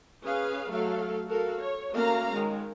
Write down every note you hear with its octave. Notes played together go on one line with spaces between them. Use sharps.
C#4 G#4 B4 F5
F#3 A3 A4 F5
F#4 A4 A#4 F5
C#5
A3 A#3 C#4 F#4 F5 A#5
D#3 G#3